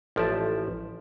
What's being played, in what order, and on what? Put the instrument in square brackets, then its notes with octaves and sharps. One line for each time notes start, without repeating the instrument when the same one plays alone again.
[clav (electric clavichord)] A1 F3 D5 E5 A5